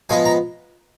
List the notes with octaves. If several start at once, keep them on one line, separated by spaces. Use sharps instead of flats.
F3 G#3 B3 G#5
A#5